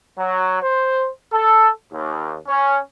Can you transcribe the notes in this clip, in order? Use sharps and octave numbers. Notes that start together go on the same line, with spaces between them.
F#3
C5
A4
D#2
C#4